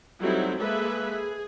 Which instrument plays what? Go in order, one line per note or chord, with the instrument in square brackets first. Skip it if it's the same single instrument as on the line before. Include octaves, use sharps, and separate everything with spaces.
[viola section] F#3 G3 A3 C4 D#4 E4
G#3 A#3 G#4 A4 B4 E5
G#4